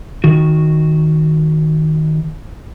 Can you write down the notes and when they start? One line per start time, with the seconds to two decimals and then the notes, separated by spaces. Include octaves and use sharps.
0.24 D#3 F#4